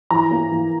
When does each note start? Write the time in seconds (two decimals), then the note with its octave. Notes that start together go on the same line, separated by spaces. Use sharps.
0.11 E3 A#5
0.31 A#3
0.51 E3